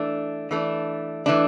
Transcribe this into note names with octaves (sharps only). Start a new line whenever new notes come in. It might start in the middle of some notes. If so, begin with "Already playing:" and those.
Already playing: E3 A3 D4
E3 A3 D4
E3 A3 D4